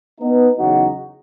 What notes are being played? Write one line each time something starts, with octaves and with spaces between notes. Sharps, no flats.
B3 D#4
E2 C#3 F#3 D#4 F#4